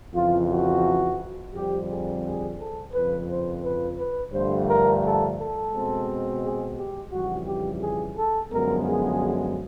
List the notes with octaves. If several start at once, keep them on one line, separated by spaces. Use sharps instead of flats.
F2 C#3 E3 F4
F#4
F2 D3 G3 C4 G4
G#4
G#4
A4
F2 C#3 F3 B4
C5
B4
B4
G2 D3 F3 A3 C5
A#4
A4
A4
B2 G#3 C4
G#4
G4
F2 C#3 E3 G3 F#4
G4
G#4
A4
F#2 D3 F3 G#3 B3 A#4
G#4